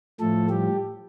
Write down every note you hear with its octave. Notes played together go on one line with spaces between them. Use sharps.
A2 F3 A3 A4
G3 G4